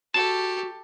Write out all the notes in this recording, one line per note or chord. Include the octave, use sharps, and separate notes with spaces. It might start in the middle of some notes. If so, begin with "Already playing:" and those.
F#4 G4 A4 A5